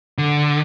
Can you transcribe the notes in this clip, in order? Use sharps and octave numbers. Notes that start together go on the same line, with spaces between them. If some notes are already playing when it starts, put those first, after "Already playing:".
D3